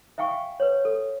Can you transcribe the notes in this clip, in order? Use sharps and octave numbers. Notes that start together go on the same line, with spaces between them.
E5 F5 G5 G#5 C#6
B4 C#5
A4